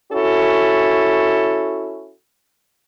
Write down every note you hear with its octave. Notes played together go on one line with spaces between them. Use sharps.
C#4 E4 F#4 A4